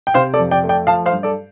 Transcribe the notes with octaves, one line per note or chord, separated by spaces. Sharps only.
G5
C3 C5 F5
A4 D5
F2
D5 G5
A3
D5 G5
F3 F5 A5
C5 F5
G2
A4 D5